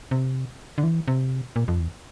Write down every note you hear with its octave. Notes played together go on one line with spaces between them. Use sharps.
C3
D3
E3
C3
A#2
F2
E2